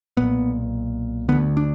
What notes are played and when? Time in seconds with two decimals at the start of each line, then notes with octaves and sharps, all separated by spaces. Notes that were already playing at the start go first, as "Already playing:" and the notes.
0.17 B1 A#2 B3
1.29 D3 B3
1.32 D2
1.57 D4